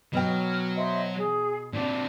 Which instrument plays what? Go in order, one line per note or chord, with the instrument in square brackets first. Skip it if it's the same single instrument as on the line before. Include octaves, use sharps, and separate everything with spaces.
[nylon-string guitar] B2 G5 [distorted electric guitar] F#3 [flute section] F6
[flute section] C5 D#5 E5
G#4
[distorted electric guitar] A#2 C4 [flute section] D4